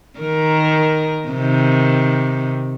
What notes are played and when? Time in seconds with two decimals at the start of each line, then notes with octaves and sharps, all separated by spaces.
0.19 D#3 A#4
1.28 C3 D#3